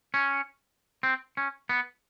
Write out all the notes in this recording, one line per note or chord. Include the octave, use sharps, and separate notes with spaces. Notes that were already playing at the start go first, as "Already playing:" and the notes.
C#4
C4
C#4
B3